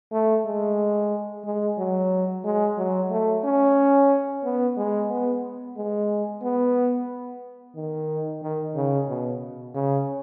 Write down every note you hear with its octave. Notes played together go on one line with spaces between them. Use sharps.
A3
G#3
G#3
F#3
G#3
F#3
A3
C#4
B3
G#3
B3
G#3
B3
D#3
D#3
C#3
B2
C#3